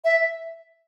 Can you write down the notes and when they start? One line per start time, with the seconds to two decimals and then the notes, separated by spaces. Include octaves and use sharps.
0.04 E5